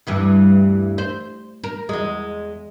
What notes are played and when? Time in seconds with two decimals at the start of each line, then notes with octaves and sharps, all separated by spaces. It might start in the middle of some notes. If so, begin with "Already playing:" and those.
0.07 D2 G2 E3
0.98 C5
1.64 A#4
1.89 E2 G#3